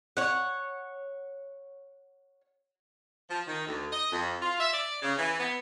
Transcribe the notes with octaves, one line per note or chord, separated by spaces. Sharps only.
C#5 F#5
F3
D#3
D2
D#5
F2
F4
E5
D5
C#3
E3
B3